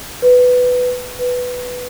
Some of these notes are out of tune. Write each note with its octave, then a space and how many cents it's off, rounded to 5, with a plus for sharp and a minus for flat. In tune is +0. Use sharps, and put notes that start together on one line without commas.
B4 +10
B4 +5